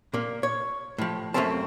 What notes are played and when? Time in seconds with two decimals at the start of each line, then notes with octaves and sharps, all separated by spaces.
0.14 A#2 A#3
0.43 C#5
0.98 A2 F3
1.34 F#2 F3 A3 A#3 C4 A5